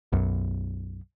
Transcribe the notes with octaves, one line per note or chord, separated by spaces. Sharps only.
B1 F#2